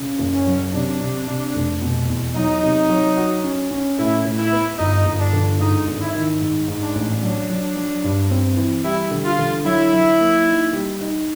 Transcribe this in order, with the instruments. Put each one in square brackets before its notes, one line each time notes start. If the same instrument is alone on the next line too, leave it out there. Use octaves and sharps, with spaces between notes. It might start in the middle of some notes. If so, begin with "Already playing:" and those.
Already playing: [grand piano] C#3
F#1
[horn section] C#4
[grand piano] F#3
[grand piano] C3 [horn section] D4
[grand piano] C3
C3
F1
B2
E2
[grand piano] F#3 [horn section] D#4
[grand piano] C3
F#3
F#4
C#4
C#4
[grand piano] A2 [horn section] E4
[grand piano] A2
[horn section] E4
[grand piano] B3
[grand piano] G1 [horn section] D#4
[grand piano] G1
[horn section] D4
[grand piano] D3
[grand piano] G#2 [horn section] D#4
[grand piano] G#1
[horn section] E4
[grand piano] D#3
G#2
G#2
[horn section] D4
[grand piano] A1
[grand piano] F#3 [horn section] D4
[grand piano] F#3
F#3
G2
C4
E3
[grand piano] G3 [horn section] E4
[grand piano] D3
[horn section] F4
[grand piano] D3
[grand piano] F#3 [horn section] E4
[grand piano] F#3
A#3
D#4
G3
D#4